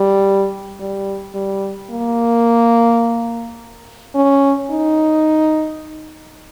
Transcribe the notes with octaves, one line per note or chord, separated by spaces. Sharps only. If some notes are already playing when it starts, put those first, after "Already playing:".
Already playing: G3
G3
G3
A#3
C#4
D#4